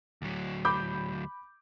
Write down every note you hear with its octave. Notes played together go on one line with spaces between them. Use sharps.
D2 F#3
B5 D6 G6